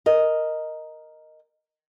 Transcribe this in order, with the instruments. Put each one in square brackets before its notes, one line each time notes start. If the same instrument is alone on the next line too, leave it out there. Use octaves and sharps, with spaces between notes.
[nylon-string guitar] A#4 D#5